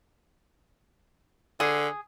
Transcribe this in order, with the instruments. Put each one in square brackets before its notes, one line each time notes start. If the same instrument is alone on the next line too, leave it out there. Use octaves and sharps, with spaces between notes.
[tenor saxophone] D3 [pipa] G#4